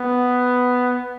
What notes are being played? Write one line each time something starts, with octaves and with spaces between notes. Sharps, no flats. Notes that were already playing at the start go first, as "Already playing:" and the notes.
Already playing: B3